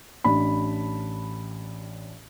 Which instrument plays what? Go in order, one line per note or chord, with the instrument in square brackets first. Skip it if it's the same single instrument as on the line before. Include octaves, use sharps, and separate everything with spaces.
[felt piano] A1 D4 B5